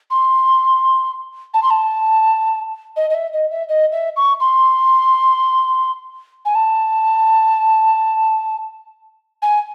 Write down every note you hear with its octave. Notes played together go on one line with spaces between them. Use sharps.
C6
A5
C6
A5
D#5
D#5
E5
D#5
E5
D#5
E5
C#6
C6
G#5
A5
G#5